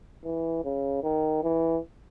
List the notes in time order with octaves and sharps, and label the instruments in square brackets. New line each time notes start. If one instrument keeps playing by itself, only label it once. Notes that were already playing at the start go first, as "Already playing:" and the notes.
[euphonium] E3
C#3
D#3
E3